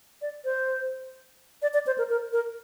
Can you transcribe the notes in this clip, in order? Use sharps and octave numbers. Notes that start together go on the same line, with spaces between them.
D5
C5
D5
D5
C5
A#4
A#4
A#4